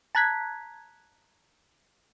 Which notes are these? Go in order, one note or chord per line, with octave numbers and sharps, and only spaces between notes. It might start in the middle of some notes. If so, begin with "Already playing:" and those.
A5 A#5 F#6 G#6 B6